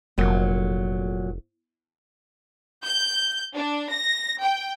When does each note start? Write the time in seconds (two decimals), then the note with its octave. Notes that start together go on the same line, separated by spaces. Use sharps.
0.18 F1 A#2 F#3
2.85 G6
3.55 D4
3.92 A#6
4.43 G5